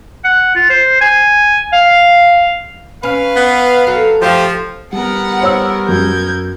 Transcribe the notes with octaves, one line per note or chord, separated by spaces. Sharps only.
F#5
F4
C5
G#5
F5
C#4 B4 F5
B3
F#3 A4
F#2 F3 A3 G4 F5
G3 B3 A#4 F#5 B5
C5 C#5 E6
F#2 G6 G#6